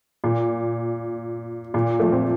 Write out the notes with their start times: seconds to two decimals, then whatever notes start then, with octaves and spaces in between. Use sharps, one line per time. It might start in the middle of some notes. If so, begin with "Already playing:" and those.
0.24 A#2
1.74 A#2
2.00 F3 A3
2.12 C4